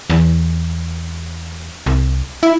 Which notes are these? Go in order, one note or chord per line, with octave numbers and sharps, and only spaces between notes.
E2
C2
E4